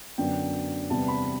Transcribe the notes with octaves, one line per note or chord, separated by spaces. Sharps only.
F#2 D3 F#3 B3 G5
E2 C3 G3 B3 A5
B5